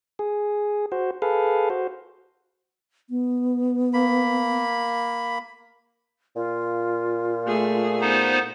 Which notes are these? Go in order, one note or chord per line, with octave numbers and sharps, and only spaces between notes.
G#4
F#4 C5
G#4 A4 B4 F5
F#4 C5
B3
A#3 B5
A#2 F4
A3 G#4
B3 D#4 C5